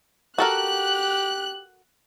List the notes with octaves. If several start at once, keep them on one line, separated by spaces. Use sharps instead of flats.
F#4 G4 A4 A#4 F#6